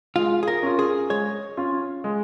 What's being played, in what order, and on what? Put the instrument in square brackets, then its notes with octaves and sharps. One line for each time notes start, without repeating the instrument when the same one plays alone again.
[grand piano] G#3 [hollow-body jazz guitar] F4
[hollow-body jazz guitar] G#4
A#4
[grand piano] C#4 F4
[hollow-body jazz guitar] G#4
[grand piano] G#3 [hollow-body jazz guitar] C#5
[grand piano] C#4 F4
G#3